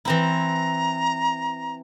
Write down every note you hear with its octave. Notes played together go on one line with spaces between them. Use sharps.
E3 C4 E4 A#5